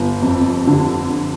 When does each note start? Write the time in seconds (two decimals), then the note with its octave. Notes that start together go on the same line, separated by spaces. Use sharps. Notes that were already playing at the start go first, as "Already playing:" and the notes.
Already playing: G1
0.22 F2
0.67 D3